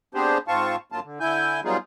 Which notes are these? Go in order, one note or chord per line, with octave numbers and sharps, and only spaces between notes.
B3 C4 D4 G4 G#4 C5
G#2 C4 F4 F5 A5 C#6
G2 F#3 A#3 F4 A5
D3
D3 E4 G#5 G6
F#3 G3 B3 D#4 F4 G#4